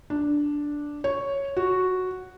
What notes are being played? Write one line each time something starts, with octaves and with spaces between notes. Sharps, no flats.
D4
C#5
F#4